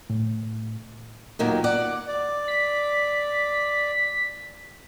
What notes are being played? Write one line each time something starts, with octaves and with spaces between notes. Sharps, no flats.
A2
D#2 A#2 D#3 F#3
D5 F#5
D5
B6